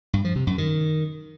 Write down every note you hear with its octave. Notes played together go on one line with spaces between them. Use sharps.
G2
F3
C3
F#2
D#3